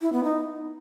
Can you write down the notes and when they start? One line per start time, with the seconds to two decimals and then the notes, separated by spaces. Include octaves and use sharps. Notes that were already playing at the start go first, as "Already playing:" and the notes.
0.02 E4
0.13 B3
0.24 D#4